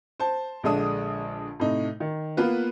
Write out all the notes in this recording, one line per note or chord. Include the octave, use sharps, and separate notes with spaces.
C5 A5
A#1 D3 G#3 D4 D#6
A2 C3 D#4
D#3
A#3 B3 F4 B4